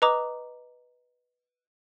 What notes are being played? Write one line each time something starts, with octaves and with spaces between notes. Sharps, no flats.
B4 D#5 A#5 D6 D#6